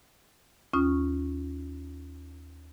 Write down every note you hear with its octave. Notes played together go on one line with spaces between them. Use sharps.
D#2 C#4 F4 C#6 D#6